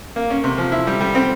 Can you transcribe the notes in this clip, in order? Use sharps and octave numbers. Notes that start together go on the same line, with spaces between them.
A#3
C#4
C3
F3
E4
G3
G3
C4